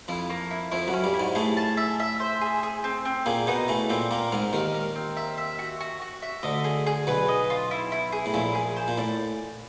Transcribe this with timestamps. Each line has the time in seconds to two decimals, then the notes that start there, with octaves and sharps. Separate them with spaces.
0.08 F2 F3 E4
0.30 A#3
0.51 E4
0.71 F2 F3 E4
0.88 F#2 F#3
0.93 C#4
1.04 G2 G3
1.14 E4
1.19 G#2 G#3
1.35 A2 A3 G#4
1.57 A5
1.77 E5
2.00 E5
2.20 C5
2.41 G#4
2.63 G#4
2.84 C4
3.05 C4
3.26 A#2 A#3 G#4
3.47 B2 B3 D#4
3.68 A2 A3 G#4
3.90 A#2 A#3 C4
4.11 A#2 A#3 A#4
4.32 G#2 G#3 A#4
4.53 D#2 D#3 A#4
4.74 A#4
4.95 C4
5.17 E5
5.38 E5
5.59 F#4
5.80 F#4
6.02 F#4
6.22 E5
6.43 D2 D3 D#5
6.64 G#4
6.87 G#4
7.07 B1 B2 B4
7.28 D#5
7.50 F4
7.71 E4
7.92 E4
8.12 G#4
8.26 A2
8.34 A#1 A#2 E4
8.55 G#4
8.77 C5
8.88 A#2
8.98 A2 D5